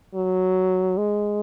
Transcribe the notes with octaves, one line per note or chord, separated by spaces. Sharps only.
F#3
G#3